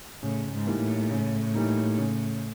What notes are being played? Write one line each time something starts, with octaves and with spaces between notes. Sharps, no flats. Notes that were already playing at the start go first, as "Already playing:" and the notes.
A2 C#3
G#2
E3 G3 A#3 D#4
A2
C#3
E3 G3 A#3 D#4
C#3